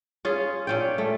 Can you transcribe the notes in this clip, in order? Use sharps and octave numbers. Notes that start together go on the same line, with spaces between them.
C#4 F4 G#4
A#2 C#4 G5
A3